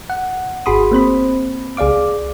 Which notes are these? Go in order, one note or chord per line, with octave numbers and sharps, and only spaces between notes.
F#5
G1 F#4 G#4 B5 C6 D#6
A#3 C4 C5 B5
C#2 G#4 D5 F5 D6